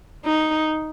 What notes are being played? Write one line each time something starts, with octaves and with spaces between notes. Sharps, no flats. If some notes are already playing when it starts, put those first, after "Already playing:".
D#4